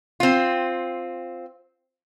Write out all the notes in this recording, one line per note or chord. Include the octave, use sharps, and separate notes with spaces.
C4 F4